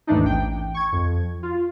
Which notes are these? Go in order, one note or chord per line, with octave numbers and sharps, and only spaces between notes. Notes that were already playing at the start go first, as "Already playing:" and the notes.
D#2 G#2 E3 A3 D4 D#4
A1 G5
C#6 G#6
F2
F4